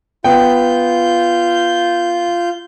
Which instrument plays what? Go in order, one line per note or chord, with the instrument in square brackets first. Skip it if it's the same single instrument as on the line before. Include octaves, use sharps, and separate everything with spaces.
[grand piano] B3 G5 [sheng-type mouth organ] F4 G6